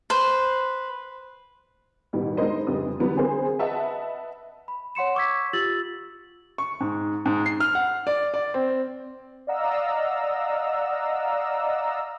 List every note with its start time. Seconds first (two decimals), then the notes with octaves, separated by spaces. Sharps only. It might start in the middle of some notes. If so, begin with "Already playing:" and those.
0.10 B4 C5
2.13 A1 E2 B2 D#3 G3
2.37 G#3 D4 D#4 A#4 C5 D#5
2.67 F1 C#2 G3 D4 D#6
2.99 D3 E3 F#3 G3 B3 C4
3.16 D3 C4 G#4 A#4 C5
3.59 B4 D#5 E5 F#5 A5
4.68 B5
4.95 C#5 F#5 C6 C#7 E7
5.15 C#6 D6 E6 G#6 B6
5.53 F4 G4 E6 A6 F#7
6.58 C#6
6.80 G#2
7.26 G#2
7.46 C7
7.60 F6
7.75 F#5
8.07 D5
8.34 D5
8.54 C4
9.47 D5 D#5 F5 F#5 A#5 E6